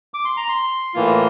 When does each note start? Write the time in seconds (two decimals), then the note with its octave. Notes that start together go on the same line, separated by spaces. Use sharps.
0.14 D6
0.25 C6
0.37 A#5
0.49 C6
0.94 A2 E3 A#3 F4